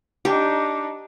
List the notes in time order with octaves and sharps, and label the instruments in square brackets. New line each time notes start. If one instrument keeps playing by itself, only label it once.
[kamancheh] D4 D#4 [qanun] G4